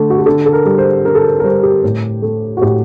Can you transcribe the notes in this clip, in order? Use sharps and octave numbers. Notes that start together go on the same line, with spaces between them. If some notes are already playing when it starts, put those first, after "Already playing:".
Already playing: D3 A3
F#4
G4
D3 A4
A4
A#4
G3
C5
D3 A#4
A4
A#4
A#4
G3 C5
G4
A2
A3
F#4
A2 G4